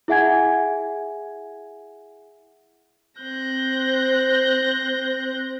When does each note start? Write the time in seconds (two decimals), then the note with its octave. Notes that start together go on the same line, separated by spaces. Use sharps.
0.08 E4 G#4 E5 F#5 G#5 G#6
3.21 C4 C5 F#6 G6 A#6